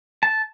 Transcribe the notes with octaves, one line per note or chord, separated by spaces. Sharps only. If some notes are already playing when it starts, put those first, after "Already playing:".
A5